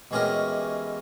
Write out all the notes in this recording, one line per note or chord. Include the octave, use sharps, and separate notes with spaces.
B2 E3 G#3 C#4 G4 A#4